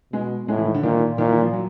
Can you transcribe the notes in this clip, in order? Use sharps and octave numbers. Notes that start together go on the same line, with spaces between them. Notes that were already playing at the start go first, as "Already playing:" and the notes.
B2 G#3
A2 G#3
E3
D#3
D3
A#2 D#3
A#2 D#3
E3
F3
F#3